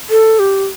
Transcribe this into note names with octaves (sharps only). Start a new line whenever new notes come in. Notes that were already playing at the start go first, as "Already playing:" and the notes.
A4
G4